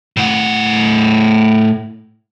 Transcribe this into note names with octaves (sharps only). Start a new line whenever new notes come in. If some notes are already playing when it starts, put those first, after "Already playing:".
A2 F#5